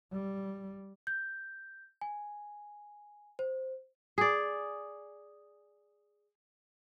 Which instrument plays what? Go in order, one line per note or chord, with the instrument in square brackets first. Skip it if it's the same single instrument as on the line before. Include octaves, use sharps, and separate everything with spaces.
[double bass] G3
[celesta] G6
G#5
C5
[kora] G#4 D5